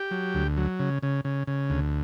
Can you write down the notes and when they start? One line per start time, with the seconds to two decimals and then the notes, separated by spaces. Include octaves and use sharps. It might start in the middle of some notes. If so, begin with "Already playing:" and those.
Already playing: G4
0.11 F#3
0.34 D2
0.57 F#3
0.80 C#3
1.03 C#3
1.25 C#3
1.47 C#3
1.70 D2